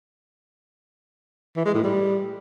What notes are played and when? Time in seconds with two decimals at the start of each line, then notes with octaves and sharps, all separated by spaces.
1.56 E3
1.65 G#3
1.74 A2
1.83 G3